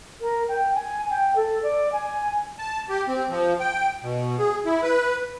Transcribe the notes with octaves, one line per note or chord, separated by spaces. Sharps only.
A#4
G5
G#5
G5
A4
D5
G#5
A5
G4
C4
F3
G5
B2
G#4
E4
B4